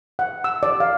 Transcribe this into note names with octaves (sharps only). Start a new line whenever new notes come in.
F#5
E6
D5
F5